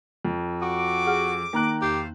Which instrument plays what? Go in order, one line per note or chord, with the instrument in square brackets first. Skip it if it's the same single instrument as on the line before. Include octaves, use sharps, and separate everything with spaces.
[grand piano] F2
[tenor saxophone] F#4 [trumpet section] D6
[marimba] G#4 F#5 F6
[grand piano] D#3 A#5 F#6 [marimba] A#3
[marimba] E2 [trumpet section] A3 C5 F5 [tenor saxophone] G4